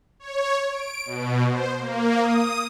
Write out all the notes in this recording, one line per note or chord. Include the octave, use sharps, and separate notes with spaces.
C#5
D7
B2
C5
A#3
D#6